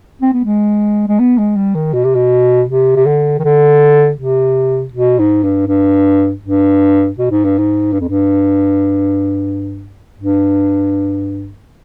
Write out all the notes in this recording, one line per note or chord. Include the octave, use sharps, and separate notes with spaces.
C4
B3
G#3
G#3
B3
G#3
G3
D#3
B2
C3
B2
C3
C3
D3
D#3
D3
C3
B2
G#2
G2
G2
G2
B2
G#2
G2
G#2
G2
F2
G2
G2